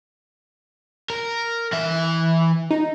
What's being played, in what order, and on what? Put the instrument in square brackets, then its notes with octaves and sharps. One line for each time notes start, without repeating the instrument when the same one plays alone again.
[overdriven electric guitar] A#4
E3 E5
[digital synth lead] D#4